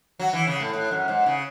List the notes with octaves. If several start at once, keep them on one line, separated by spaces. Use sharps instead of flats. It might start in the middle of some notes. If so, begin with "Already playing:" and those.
F#3
E3
C#3
A2
A2
F#2
G#2
C#3